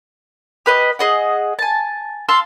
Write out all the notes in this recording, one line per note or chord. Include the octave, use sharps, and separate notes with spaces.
G4 B4 D#5
G#4 D#5 F#5
G#5 A5
F5 A5 C6 E6